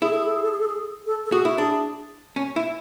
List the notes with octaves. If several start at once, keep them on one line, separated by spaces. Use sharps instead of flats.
E4 G#4
A4
G#4
A4
G#4
A4
G#4
A4
G#4
A4
A4
F#4 G#4
E4
D4 G#4
C#4
E4